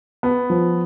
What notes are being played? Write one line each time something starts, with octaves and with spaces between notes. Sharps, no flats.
B3
F3